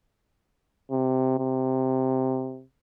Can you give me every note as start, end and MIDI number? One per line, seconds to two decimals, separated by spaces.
0.91 1.38 48
1.39 2.63 48